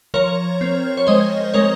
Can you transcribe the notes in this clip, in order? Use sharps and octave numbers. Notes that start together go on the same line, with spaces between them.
F3 A#4 C#5
C4
C#5
G#3 C5 D#5
G#3 A#4 C#5